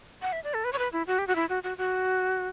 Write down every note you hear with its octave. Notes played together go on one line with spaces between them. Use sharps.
F#5
E5
D5
A4
B4
C#5
B4
E4
F#4
G4
F#4
E4
F#4
F#4
F#4